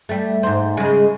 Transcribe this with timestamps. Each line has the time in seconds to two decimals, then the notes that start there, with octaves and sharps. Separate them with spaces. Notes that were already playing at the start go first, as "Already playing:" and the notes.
0.09 G3 A3
0.43 G#2 C5
0.77 C#3 G#3